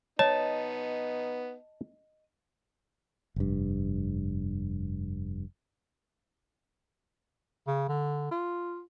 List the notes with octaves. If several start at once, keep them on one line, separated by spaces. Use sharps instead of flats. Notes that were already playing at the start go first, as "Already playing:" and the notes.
B3 D#4 C#5 D#5 A5
F1 G2
C#3
D3
F4